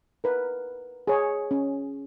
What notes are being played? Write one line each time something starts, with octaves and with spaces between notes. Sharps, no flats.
A#4 B4
G#4 C#5
C#4